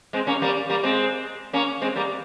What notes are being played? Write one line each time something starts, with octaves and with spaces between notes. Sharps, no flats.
G#3 C4
A#3 C#4
G3 A#3
G3 A#3
G#3 C4
A#3 C#4
G#3 C4
G3 A#3